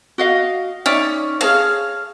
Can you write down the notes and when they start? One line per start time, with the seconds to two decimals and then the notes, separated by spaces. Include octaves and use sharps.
0.18 F#4 D#5 F5
0.86 C#4 D#4 D5 E5
1.41 G#4 C#5 F5 A5